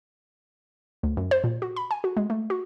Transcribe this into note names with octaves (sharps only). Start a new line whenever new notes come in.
D2
F#2
C5
A#2
F#4
B5
G#5
F#4
G#3
A3
F#4